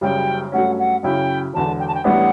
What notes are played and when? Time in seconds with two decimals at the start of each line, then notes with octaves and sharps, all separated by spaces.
0.01 F#1 F#2 C#3 G3 G5
0.52 G2 F#3 A3 C#4 F#5
0.78 F#5
1.03 F#2 C#3 F#3 C#4 E4 G5
1.54 E1 E2 D3 A5
1.79 G5
1.87 A5
1.94 G5
2.04 A1 A2 G3 B3 D4 F#5